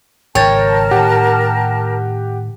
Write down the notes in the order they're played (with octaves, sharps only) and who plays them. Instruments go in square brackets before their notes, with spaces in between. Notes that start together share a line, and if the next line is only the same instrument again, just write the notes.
[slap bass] G#1 C#3 [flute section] A#4 A5 [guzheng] C#5 [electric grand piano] G5 A6
[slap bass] A2 D#3 [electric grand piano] G4 F#5